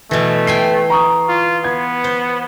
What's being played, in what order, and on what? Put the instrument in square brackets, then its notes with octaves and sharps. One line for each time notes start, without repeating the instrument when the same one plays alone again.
[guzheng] B2 E3 [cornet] A3
[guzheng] G5 G#5 C6 [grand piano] C7
[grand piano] A#5 C#6 D#6
[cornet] F4
[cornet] B3 [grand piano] G#6
[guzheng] C5